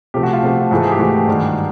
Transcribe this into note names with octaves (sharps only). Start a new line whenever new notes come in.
C3 F3 A3 G4
F#4
F4
C3 F3 A3
G#2 E3 A3
G#4
G4
G#2 E3 A3 F#4
G2 D#3 G#3